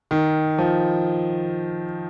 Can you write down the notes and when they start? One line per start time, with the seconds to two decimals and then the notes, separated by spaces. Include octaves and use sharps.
0.11 D#3
0.58 F3